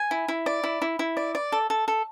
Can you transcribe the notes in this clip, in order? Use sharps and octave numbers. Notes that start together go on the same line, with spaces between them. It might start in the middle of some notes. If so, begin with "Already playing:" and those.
Already playing: G#5
E4
E4
D5
E4
E4
E4
D5
D5
A4
A4
A4